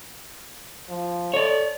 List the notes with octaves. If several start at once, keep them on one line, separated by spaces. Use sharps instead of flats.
F3
A4 C#5 D5